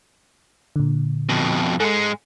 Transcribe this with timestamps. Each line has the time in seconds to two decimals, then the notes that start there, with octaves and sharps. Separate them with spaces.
0.76 A#2 D3
1.29 F2 B2
1.80 G#2 G#3 A4 C#7